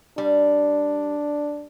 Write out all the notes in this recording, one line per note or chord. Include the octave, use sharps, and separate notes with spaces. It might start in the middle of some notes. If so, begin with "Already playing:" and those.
G3 D4